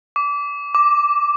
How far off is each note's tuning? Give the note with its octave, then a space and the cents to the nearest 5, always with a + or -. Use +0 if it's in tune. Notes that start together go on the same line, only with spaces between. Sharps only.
D6 -25
D6 +0